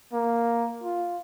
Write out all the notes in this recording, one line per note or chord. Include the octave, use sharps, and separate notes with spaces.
A#3
F4